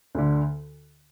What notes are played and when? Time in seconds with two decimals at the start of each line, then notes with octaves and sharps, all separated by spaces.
0.15 D2 D3